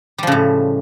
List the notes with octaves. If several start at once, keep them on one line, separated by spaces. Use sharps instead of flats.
A2 C#3 F3 G3